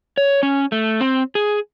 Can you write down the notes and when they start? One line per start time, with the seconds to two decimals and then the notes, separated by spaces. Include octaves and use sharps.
0.17 C#5
0.43 C#4
0.72 A3
1.01 C4
1.35 G#4